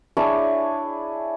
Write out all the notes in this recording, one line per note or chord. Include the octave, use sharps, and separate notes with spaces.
D4 E4 G#4 C#5